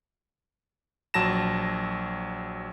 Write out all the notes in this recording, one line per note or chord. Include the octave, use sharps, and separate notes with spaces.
A#1 F#3 A5 A#6 E7